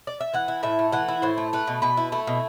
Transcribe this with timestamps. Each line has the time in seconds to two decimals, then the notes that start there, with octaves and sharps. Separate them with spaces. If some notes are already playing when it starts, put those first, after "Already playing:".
0.07 D5
0.21 E5
0.34 E3 F#5
0.48 E4
0.63 A2 E5
0.79 A3
0.92 E3 F#5
1.08 E4
1.22 A2 C5
1.38 A3
1.53 A3 B4
1.67 B2
1.82 B2 B4
1.97 E4
2.12 A3 E4
2.27 B2